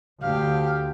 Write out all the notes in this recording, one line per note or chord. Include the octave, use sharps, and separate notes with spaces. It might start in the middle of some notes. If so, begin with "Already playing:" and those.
D2 G4 F5